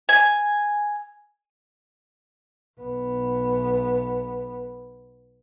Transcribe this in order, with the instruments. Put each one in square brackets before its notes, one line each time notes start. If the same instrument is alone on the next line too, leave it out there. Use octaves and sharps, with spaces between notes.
[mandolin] G#5
[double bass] B1 B3